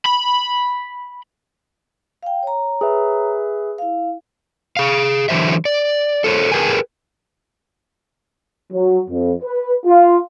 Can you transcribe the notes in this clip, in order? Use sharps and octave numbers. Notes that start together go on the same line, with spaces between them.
B5
F5 G5
C#5 A#5
G#4 B4 E5
E4 F5
G#4 F5
D3 E3 F#3 C5 E5
D5
A4 C5 C#5
G#4 A#4 B4 G5 G#5
F#3
F2
B4
F4